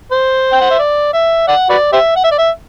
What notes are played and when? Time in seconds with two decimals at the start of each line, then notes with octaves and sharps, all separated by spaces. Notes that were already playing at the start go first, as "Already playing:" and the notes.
0.11 C5
0.52 G5
0.61 F#5
0.70 E5
0.79 D5
1.13 E5
1.48 D5 F#5
1.70 F#4 B4 D5
1.93 G4 C5 E5
2.16 F#5
2.24 E5
2.31 D5
2.38 E5